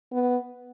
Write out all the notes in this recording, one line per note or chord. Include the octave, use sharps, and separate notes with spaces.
B3